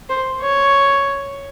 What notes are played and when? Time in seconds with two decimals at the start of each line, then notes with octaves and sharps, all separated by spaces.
0.09 C5
0.41 C#5